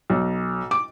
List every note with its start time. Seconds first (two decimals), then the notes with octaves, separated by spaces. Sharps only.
0.10 B1
0.71 D6